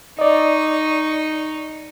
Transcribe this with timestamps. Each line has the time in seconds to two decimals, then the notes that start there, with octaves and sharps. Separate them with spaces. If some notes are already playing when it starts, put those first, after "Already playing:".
0.19 D#4 D5 D#5 C#6